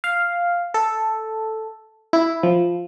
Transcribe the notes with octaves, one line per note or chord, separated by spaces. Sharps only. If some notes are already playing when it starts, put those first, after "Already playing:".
F5
A4
E4
F3